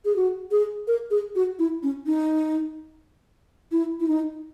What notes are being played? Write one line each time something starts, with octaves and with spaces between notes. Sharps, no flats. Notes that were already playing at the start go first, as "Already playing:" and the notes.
G#4
F#4
G#4
A#4
G#4
F#4
E4
C#4
D#4
E4
E4
D#4